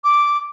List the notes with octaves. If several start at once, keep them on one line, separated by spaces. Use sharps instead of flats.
D6